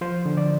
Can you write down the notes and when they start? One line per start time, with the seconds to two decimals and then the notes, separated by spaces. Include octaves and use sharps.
0.01 F3 C5
0.26 D3
0.37 D5